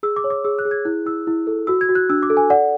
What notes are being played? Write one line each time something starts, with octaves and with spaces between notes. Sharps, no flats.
G#4 E6
D6
C#5
D6
G#4 E6
F#6
G#4
G#6
E4 F#6
E4 E6
E4
A4
F#4 E6
G#6
F#4
F#6
D4 E6
D6
A4
G#5
D5 F#5